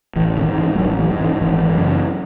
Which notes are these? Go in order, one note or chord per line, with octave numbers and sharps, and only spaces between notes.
A1 E3
D#3
G#2
E3
G#3
A1 F#3
E3
G#2
E3
G#1 E3
F#2 C#3